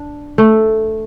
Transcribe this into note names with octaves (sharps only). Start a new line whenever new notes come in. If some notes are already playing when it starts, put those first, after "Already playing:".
Already playing: D4
A3